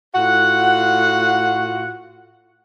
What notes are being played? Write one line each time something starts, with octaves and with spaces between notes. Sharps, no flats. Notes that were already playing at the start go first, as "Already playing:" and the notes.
A2 F4 F#4 F#5